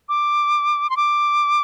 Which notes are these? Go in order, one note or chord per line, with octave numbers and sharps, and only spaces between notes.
D6
C6
D6